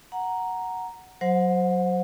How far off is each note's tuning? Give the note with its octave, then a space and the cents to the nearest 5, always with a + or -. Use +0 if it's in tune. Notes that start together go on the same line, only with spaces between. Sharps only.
F#5 +0 A#5 +0
F#3 +0 C5 +0 F#5 -35